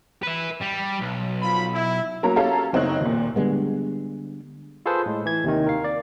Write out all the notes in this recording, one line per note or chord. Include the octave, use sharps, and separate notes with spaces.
B4 E5
G3
B1
F3 B5
E4
F#3 A#3 C#4 A#5
C#4 G4 A4 F5 A#5
F#1 C4 D#4 C#5 F#6
D#2 A#2
D3 G3 G#3 B3
F4 G#4 A4 B4 C5
A2 G#3
E3 G#6
D#2 C3 D#3
A#4 F5
D5